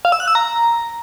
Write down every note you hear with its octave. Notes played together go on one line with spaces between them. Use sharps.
F5
E6
F#6
E6
A#5